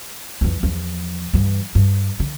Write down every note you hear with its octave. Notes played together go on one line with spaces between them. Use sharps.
F2 E3
E2 F3
G2 E3
G2
D3